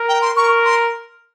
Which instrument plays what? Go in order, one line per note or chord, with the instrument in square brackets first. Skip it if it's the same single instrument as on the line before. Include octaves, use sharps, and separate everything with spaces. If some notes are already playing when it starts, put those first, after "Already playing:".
Already playing: [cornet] A#4
[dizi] G5
C6
[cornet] A#4 [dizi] C#6
[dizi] C6